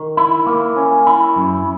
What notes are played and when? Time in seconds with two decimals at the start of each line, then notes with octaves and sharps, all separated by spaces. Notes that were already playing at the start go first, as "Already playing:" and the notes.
Already playing: D#3
0.17 E4
0.47 A#3
0.76 C#4
1.07 E4
1.36 F#2